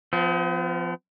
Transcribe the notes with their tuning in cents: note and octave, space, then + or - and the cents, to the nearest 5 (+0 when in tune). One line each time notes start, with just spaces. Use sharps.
F3 +0 B3 +45